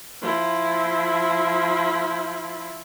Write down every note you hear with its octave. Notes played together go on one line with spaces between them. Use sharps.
F3 E4